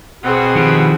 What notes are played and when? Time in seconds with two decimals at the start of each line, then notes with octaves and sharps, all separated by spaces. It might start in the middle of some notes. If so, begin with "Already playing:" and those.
0.23 B2 C4 G#4 F#5
0.55 D#3 F3 G4